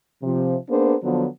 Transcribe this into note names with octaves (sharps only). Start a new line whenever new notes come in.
C3 F3
A#3 B3 D4 G#4 A#4 C5
D3 F3 F#3 B3